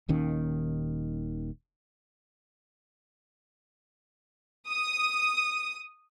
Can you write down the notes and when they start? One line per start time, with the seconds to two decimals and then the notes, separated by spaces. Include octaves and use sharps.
0.09 D#1 D#2 D#3 C#4
4.70 D#6